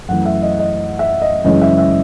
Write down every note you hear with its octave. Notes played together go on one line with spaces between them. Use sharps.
F#2 E3 A3 F#5
E5
D#5
D#5
D#5
E5
D#5
F#2 C#3 E3 G#3 C#4 D#5
E5
E5